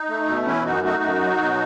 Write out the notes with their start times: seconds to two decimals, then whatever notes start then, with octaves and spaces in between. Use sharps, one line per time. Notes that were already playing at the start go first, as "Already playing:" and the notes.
Already playing: D#4
0.09 A3
0.27 B2
0.47 E3 C#4 E4
0.65 F#2 D#4 F#4
0.84 A3 D#4 F#4
1.03 F#2
1.22 F#3
1.41 B2